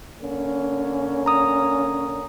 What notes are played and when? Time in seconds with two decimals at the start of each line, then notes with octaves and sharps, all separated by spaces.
0.21 D3 A#3 C#4
1.26 A#5 D#6